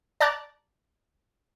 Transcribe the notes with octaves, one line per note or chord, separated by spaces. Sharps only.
D5 A5 A#5 D6 F#6 A6